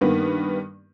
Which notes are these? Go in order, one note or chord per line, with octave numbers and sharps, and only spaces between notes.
G2 D#3 A#3 B3